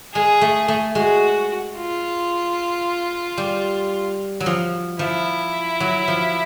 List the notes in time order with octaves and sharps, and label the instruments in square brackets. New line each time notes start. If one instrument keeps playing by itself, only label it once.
[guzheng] G#3 [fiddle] G#4
[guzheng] A3
A3
[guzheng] G#3 [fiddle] F#4
[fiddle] F4
[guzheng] G3
F#3
F3
[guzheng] F3 [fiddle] E4
[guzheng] F#3
F3